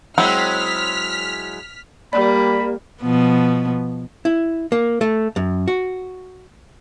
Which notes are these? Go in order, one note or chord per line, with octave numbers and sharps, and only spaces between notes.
F#3 G#3 C4 E4 F#5 F6 B6
G3 A#3 D5 B5
B2 F3 B3
E4
A#3
A3
F#2
F#4